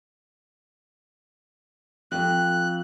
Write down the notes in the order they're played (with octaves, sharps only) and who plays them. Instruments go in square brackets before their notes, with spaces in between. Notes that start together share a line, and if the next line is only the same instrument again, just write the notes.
[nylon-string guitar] F2 [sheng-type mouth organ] F#6